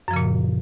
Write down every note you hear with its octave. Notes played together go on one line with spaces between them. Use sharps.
F#2 A#2 C#3 F3